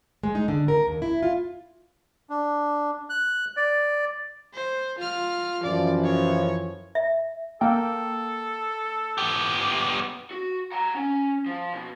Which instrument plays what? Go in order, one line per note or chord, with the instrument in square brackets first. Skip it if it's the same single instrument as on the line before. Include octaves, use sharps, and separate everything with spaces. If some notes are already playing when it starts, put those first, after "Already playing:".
[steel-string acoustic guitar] G#3
D#4
D3
A#4
D#2
E4
F4
[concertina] D4
F#6
D5
[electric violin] C5
F4 F6
[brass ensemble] F#2 E3 F3 [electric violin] D5
[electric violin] C#5
[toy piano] E5
[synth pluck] A#3 G5 [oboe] A4
[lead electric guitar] B3 G4
F#4
F#5 A#5
C#4
F3
B2